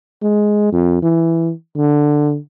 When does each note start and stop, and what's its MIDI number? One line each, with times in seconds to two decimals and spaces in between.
0.22 0.68 56
0.72 0.99 41
1.02 1.52 52
1.77 2.37 50